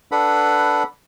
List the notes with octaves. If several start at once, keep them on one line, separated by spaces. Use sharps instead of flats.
D4 A4 B4 F#5 B5